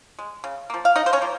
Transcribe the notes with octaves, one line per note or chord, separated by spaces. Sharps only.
G#3
C#3
F3 A#3
F5
C#3 D#4 D#5
C5
C#4 C#5
F3 A#3